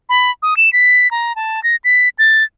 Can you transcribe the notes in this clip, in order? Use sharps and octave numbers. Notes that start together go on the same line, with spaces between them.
B5
D#6
E7
B6
A#5
A5
A#6
B6
A6